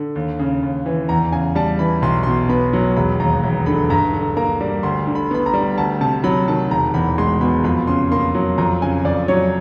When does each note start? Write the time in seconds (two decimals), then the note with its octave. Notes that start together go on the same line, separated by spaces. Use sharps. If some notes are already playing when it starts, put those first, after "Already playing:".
Already playing: D3
0.15 D#2
0.39 C#3
0.63 D#2
0.86 E3
1.09 E2 A#5
1.32 C#3 G#5
1.55 G3 A5
1.79 E3 B5
2.02 B1 C6
2.23 C6
2.27 B2
2.49 B3 B5
2.73 F#3
2.96 E1 B5
3.20 D#2 A#5
3.43 E1
3.66 D3 B5
3.90 G2 A#5
4.13 D3
4.37 A#3 A#5
4.61 G3
4.83 D2 C6
5.07 D3
5.15 B5
5.31 B3 B5
5.46 A#5
5.53 G3
5.78 D2 A5
6.01 C3 A5
6.24 F#3 B5
6.48 D#3 A5
6.71 E1 A#5
6.94 E2 B5
7.18 G#3 C6
7.41 B2 B5
7.64 F2 B5
7.87 C#3 C6
8.11 A#3 C6
8.35 F#3
8.58 F2 A#5
8.82 C#3 G#5
9.05 F2 D5
9.28 F#3 C#5